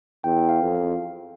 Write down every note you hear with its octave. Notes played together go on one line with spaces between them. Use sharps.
E2 G5
F5
F2
F5